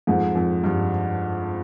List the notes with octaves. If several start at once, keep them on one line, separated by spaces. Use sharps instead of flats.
F2 G#2
F2
G2